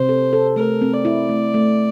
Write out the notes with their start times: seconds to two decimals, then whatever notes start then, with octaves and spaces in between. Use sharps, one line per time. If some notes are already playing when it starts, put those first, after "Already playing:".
Already playing: C3 C5
0.09 A4
0.33 A4
0.56 A3 A#4
0.81 C4
0.93 D5
1.05 E4
1.29 A3
1.54 A3